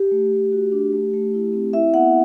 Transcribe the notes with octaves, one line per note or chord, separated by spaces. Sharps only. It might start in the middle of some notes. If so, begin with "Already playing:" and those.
Already playing: G4
A3
A3
F#4
D4
A3
A3
E4
C4
E4 E5
B3 F#5